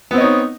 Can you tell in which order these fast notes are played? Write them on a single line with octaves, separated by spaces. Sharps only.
B3 C4 D#5 C#5 D#4